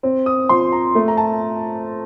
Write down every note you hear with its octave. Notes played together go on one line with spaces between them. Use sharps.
C4
D#6
F3 C6
A#5
A3
A#5
A5